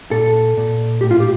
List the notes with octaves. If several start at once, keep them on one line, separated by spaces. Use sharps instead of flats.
A#2 A4
A#2
A2 G4
F4
G4